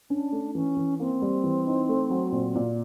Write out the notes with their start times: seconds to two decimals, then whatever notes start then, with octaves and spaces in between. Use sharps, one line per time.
0.10 C#4 D4
0.32 A3
0.55 E3 C#4
0.77 E3
1.00 A#3 C4
1.22 G3
1.44 E3
1.67 D#4
1.89 A3
2.10 F#3
2.32 A#2
2.55 A#2